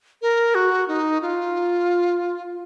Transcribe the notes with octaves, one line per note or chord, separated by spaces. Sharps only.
A#4
F#4
D#4
F4